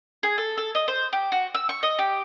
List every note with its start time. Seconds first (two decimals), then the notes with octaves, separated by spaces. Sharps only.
0.23 G#4
0.38 A4
0.58 A4
0.75 D#5
0.88 C5
1.13 G4
1.32 F#4
1.55 E6
1.69 C#6
1.83 D#5
1.99 G4